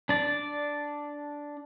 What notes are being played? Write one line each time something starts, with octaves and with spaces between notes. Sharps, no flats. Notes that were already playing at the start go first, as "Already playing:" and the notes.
D4 D5